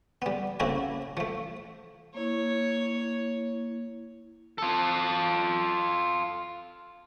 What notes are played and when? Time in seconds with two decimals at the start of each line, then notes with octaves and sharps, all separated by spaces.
0.22 G3 B3
0.60 C#3 A#3 C4 E4 F#4 A#4
1.17 F3 A3
2.15 A#3 E4 C#5
4.58 F4 A4